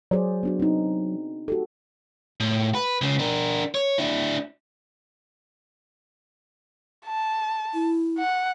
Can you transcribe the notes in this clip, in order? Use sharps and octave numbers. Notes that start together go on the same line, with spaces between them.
F#3 G#4 C5 D5
B3 D4 F#4
C4 D#4
F#4 G4 A4
A2
B4
C#2 C#3
D4 A#4
C#5
D4 E4
A5
E4
F#5